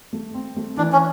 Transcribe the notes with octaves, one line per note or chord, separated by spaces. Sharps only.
A3
C4
A3
E3 D4
C#4